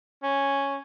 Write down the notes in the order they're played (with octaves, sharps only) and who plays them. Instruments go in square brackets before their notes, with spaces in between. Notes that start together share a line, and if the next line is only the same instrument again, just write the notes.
[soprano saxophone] C#4